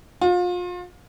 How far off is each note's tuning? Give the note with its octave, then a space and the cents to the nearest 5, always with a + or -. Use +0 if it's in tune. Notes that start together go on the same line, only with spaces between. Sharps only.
F4 +35